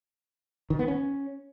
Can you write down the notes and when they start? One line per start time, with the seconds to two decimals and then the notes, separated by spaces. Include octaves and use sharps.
0.70 D#3
0.79 B3
0.88 C#4